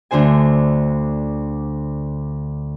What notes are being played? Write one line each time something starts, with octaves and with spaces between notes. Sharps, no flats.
D2 D3 D4 C5 G#5